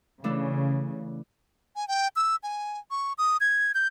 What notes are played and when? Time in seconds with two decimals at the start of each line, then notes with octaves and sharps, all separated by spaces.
0.24 C#3 E3 A3 D4
1.76 G#5
1.88 G5
2.16 E6
2.43 G#5
2.91 C#6
3.18 D#6
3.41 G#6
3.74 G6